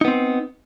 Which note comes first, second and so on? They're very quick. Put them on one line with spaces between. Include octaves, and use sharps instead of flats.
D#4 B3 C4